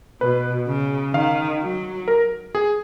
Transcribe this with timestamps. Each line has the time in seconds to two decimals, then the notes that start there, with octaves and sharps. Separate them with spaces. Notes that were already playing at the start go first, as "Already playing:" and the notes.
0.21 B2 B4
0.67 C#3
1.14 D#3 F5
1.61 F#3
2.08 A#4
2.55 G#4